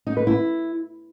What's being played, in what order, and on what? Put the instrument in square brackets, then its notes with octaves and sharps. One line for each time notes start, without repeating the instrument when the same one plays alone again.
[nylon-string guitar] D#4
B4
E4